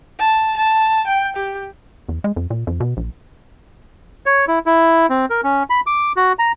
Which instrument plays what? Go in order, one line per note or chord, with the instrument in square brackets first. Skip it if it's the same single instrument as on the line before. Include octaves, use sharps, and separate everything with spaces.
[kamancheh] A5
A5
G5
G4
[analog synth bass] E2
G#3
F2
A#2
F2
B2
A#1
[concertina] C#5
E4
E4
C4
A#4
C#4
B5
D6
F#4
A#5